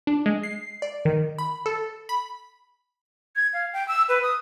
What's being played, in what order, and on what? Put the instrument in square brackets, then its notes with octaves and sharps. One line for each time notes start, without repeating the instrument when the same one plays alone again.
[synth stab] D4
G#3
C7
D5
D#3
B5
A4
B5
[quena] G#6
F5
G5
E6
B4
D#6